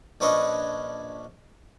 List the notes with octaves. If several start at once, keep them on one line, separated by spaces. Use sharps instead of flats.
A#1 C#4 D4 B4 C#5 D#5